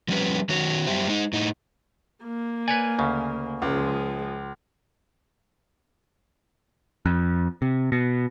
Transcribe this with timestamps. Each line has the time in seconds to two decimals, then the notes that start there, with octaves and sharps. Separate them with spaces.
0.08 F3 G3 C#4 B4
0.49 D#3 C#4 F#4 C#5
0.87 F#2 G3 G4 C5 E5
1.07 G#3 D#4
1.33 A2 D#4
2.23 A#3
2.68 B4 C#5 D5 G#5
2.99 D2 C#3
3.62 C#2 F3 G#3
7.06 F2
7.62 C3
7.92 B2